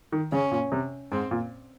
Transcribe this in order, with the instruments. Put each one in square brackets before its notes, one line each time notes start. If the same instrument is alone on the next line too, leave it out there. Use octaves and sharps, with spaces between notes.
[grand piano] D#3
[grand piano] C#3 [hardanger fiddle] C#4
[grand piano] A#2
C3
[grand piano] G#2 [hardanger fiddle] C4
[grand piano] A#2